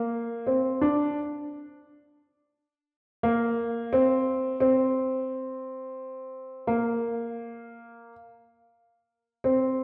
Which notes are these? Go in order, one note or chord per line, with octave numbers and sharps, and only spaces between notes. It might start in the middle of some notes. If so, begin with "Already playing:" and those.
Already playing: A#3
C4
D4
A#3
C4
C4
A#3
C4